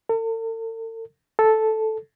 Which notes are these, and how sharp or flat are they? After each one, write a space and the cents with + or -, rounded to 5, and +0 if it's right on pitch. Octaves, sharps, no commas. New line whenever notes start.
A4 +45
A4 -5